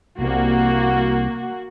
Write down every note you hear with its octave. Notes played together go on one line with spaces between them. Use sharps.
C2 A#3 F#4